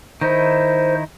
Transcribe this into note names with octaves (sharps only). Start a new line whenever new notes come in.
D#3 D#4 E4 C5